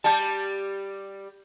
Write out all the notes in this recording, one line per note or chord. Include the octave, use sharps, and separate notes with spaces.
G3 G4 A5